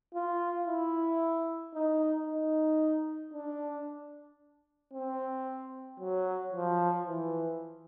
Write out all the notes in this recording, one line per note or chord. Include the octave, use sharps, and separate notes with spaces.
F4
E4
D#4
D#4
D4
C4
F#3
F3
E3